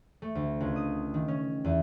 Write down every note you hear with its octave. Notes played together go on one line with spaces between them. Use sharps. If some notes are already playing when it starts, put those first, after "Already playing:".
A3
D2
C#2
D#6
D#3
C#4
E2